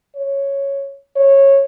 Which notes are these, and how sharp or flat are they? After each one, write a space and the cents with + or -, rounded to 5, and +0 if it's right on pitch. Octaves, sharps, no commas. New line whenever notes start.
C#5 -5
C#5 -15